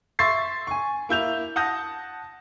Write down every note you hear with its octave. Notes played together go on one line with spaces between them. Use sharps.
E5 C6 C#6 A6 C7
G#5 C#6
A#3 E4 G6 F7
F#5 A5 D#6 G6 A#6